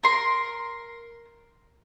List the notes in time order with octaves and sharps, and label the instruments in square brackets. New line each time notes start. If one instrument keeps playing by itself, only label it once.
[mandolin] A#4 C6